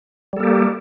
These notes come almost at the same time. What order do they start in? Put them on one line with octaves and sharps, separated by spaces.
G3 A4 A#3 G4